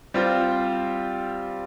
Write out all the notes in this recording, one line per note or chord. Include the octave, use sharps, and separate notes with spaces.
G3 C4 F4 C5